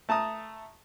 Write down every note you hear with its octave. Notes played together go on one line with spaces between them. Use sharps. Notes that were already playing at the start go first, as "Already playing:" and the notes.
A3 A5 A#5 D#6